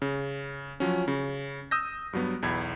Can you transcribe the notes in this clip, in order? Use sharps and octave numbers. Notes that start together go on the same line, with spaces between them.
C#3
F3 F#3 C#4
C#3
D#6 E6 G6 A#6
G2 F#3 B3
B1 E2 B5 G#6